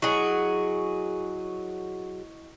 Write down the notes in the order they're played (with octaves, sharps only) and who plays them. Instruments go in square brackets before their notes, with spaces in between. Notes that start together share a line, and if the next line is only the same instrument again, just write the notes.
[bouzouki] F#3 G#4 [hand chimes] E4 D#5 C#6